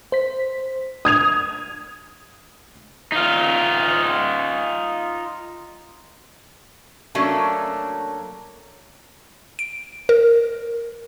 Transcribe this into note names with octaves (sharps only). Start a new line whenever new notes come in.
C5 B6
D#6 G#6 F7
D#4 F4
F#3 A3 A#3 C#4 D4
D7
A#4